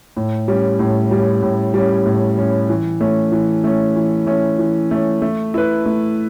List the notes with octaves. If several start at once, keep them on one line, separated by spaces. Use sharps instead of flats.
A2
G3 C#4
A2
G3 C#4
A2
G3 C#4
A2
G3 C#4
E3
A3 C#4
E3
A3 C#4
E3
A3 C#4
E3
A3 C#4
A3
E4 B4
A3